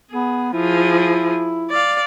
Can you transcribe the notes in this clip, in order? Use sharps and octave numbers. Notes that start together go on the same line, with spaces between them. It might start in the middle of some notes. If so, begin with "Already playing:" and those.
B3 G#4
F3 E4 G#4
D5 F5